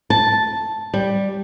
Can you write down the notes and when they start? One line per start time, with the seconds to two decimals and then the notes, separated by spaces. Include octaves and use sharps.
0.10 A5
0.94 G3